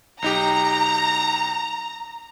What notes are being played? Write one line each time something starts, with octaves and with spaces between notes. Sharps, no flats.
B1 D#4 G4 A#5